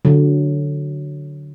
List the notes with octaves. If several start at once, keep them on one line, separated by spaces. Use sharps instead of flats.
D3 F#3